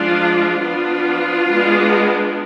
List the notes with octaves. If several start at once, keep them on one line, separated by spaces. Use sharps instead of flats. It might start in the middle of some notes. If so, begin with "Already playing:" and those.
Already playing: F3 G#3 D4 F4
F3 B3 D4 F4
G#3 B3 D4